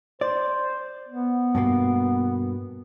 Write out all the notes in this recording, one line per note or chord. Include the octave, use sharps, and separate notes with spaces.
C5 D5
B3
G2 B2 A#3